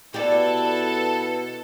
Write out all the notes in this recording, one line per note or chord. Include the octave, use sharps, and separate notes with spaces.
B2 B3 E4 G4 A4 B4 D5